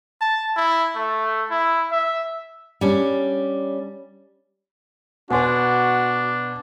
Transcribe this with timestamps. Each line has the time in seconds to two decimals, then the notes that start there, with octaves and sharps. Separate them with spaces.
0.21 A5
0.57 E4
0.96 A3
1.51 E4
1.92 E5
2.81 G3 C#4 D4
5.30 B2 B3 D4 F#4 F#5 G#5 C6